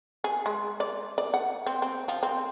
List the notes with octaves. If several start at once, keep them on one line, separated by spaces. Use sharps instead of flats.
G#4
G#3
D5
D5
F#5
C4
C4
F3
C4